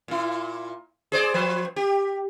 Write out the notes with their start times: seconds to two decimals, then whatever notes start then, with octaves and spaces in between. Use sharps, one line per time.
0.08 A#2 E4
1.12 G#4 C5 D5
1.34 F3 B4 C5
1.76 G4